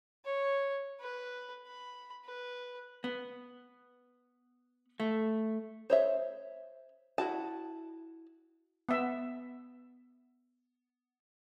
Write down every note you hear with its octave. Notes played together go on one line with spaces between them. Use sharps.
C#5
B4
B5
B4
B3
A3
C5 C#5 E5
E4 F#4 A5
B3 E5